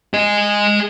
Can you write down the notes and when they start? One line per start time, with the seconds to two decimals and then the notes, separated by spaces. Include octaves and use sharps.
0.14 G#4 D#5